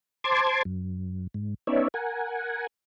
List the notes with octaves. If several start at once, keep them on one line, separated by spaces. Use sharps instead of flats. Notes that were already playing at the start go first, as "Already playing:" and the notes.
C5 A5 C6 D6 G#6
F#2
G#2
B3 C#4 D#4 C#5 D5 E5
A#4 F#5 G#5